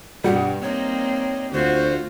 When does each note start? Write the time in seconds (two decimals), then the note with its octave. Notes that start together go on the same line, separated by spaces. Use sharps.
0.24 G2 B2 G3 F#5
0.62 A#3 C4 D#4 C#5
1.53 D2 F4 F#4 C5